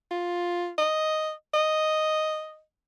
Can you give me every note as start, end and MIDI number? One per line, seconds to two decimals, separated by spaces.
0.11 0.71 65
0.78 1.32 75
1.54 2.62 75